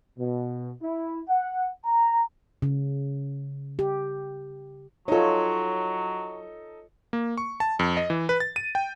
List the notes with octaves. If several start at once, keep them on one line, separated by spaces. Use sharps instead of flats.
B2
E4
F#5
A#5
C#3
G4
F#3 D#4 F4 A4 C#5
A#3
C#6
A5
F2
D#5
E3
B4
A6
D#7
G5